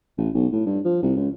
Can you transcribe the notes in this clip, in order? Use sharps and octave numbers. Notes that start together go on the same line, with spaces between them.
A1
B1
A2
G2
F3
C2
C#2